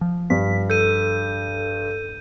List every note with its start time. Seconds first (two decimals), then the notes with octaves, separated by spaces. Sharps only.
0.01 F3
0.30 G2 B6
0.70 A4 G6 D#7